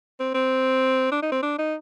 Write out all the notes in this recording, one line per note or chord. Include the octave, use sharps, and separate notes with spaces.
C4
C4
D4
D#4
C4
D4
D#4